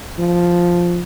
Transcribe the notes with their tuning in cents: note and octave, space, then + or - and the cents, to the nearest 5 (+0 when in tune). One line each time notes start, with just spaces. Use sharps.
F3 +0